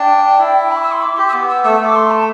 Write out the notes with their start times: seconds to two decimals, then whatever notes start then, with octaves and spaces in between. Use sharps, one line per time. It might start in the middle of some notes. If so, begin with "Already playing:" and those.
Already playing: D4 G5
0.39 E4
0.71 B5
0.76 D6
0.82 E6
0.92 C6
1.01 D6
1.17 G4 C6
1.28 E6
1.33 B3 D6
1.48 E6
1.64 A3 E6
1.75 E6
1.80 A3
1.86 D6
1.95 C6
2.11 A5